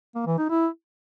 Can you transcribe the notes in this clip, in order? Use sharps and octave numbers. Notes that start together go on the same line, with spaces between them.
A#3
E3
D#4
E4